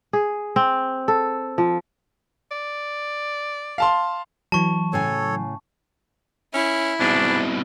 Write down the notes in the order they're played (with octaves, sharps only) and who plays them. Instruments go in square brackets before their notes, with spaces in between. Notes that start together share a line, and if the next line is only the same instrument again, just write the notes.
[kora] G#4
C4
A4
F3
[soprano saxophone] D5
[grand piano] F5 A5 C6
[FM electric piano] E3 F#3 [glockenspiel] A5 C#6
[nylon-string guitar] A2 C#3 G#5 [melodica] A4 C#5
[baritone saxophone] C#4 [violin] E4
[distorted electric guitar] C2 B2 [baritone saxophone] G#2 [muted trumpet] D4